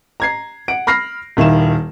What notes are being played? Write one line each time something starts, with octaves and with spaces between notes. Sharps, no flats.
A#5 G#6 C7
F#5 D7
B5 F6 A#6 C7
D#1 D#3 E4 F5 E7